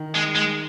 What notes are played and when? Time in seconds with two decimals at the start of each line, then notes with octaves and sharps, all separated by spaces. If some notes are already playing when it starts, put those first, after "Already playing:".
Already playing: D#3
0.15 G#3
0.36 G#3